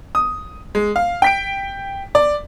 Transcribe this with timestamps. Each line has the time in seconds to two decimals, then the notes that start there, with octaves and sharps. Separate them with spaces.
0.15 D#6
0.75 G#3
0.96 F5
1.22 G5 B6 D7
2.15 D5